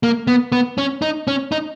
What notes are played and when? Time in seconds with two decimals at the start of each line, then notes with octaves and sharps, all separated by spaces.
0.03 A#3
0.27 B3
0.52 B3
0.78 C#4
1.02 D#4
1.28 C#4
1.52 D#4